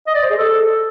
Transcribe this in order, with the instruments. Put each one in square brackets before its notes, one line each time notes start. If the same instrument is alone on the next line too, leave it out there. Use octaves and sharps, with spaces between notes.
[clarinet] D#5
D5
C5
G#4
A4